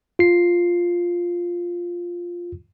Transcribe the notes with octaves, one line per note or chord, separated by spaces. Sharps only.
F4 C7